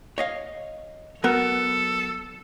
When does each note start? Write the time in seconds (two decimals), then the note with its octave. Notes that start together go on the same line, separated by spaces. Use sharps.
0.18 C#5 D#5 F5
1.24 F#3 B3 A4 A#4